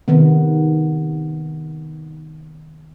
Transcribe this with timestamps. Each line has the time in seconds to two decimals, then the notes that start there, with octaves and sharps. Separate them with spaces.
0.08 C3 D#3 B3